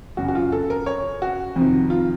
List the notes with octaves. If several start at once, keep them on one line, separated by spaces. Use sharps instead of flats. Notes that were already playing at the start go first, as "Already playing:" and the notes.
F#2 C#3 F#4
F#4
F4
A4
A#4
C#5
F#4
F2 C3 D#3
F4